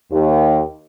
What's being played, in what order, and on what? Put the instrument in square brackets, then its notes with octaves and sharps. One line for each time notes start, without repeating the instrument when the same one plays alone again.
[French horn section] D#2